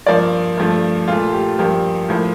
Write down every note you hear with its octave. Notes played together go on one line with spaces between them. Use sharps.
G2 F3 A#3 D5
G2 F3 A3
A#2 A3 F4
G4
G2 F3 A#3 G4
A2 F3 A#3